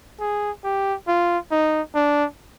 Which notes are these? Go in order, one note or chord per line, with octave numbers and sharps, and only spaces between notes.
G#4
G4
F4
D#4
D4